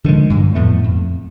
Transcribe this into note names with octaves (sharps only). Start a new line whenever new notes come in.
D3 D#3 F3 G#3
G2 D3 F#3
F2 A2 A3 B3
F2